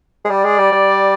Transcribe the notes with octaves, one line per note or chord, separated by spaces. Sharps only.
G#3
G3 D5
G#3
G3
G3